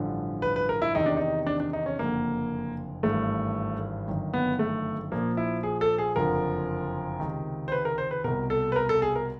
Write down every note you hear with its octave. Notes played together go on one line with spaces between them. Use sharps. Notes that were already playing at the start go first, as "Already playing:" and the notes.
Already playing: A1 G2 D3 F3
B4
B4
A#4
E4
E2 C3 D#3 D#4
D4
D#4
D4
D4
D#4
C#4
F#1 F2 D3 A#3
G#1 G2 E3 A3
G1 F#2 D#3
B3
A3
A#1 A#2 F3 A#3
E4
G#4
A4
G#4
F#1 F2 D3 F3 A#4
C#2 C3 D#3
C5
B4
A#4
C5
B4
C2 B2 A#4
A4
B4
A#4
A4
G#4
A#4